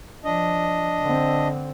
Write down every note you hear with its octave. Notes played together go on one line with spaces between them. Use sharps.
F3 D4 D#5
D3 C4